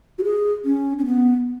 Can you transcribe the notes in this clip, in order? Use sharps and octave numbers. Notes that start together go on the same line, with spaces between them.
F#4
G#4
C#4
C#4
B3